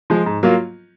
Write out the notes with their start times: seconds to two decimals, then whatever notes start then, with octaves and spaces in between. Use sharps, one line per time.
0.10 F3 G#3
0.26 G#2
0.43 F#3 A#3 F4